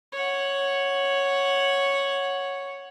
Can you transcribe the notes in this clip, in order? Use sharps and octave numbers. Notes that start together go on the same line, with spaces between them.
C#5 F#5